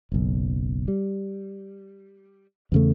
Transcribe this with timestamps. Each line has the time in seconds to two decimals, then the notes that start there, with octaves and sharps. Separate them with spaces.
0.12 F#1 B1
0.88 G3
2.72 E2 C#3 A3